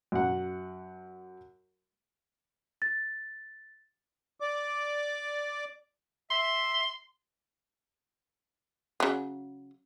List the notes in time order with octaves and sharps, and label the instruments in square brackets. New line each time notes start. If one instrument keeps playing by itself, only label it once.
[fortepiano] F#2 F#5
[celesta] A6
[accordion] D5 D6
[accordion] E5 [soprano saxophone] C6
[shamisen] C#3 F#3